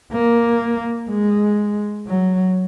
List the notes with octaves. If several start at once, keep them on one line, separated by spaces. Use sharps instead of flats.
A#3
G#3
F#3